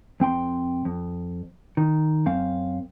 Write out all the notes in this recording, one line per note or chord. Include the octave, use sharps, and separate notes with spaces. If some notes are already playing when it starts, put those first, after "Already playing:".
F2 C4 G5 C6
F2
D#3
F#2 C4 F5